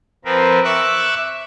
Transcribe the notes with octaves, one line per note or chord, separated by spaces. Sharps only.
F3 C4 A#4 B4
E5 C#6 D6 E6 F#6